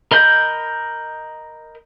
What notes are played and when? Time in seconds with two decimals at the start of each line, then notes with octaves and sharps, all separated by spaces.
0.11 A#4 D#5 B5 G6